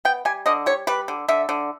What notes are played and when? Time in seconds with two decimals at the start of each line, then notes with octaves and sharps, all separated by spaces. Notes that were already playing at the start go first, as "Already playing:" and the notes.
0.05 B3 G5
0.25 G3 G#5
0.46 D3 D#5
0.66 G3 C#5
0.87 G3 B4
1.08 D3
1.29 D3 E5
1.49 D3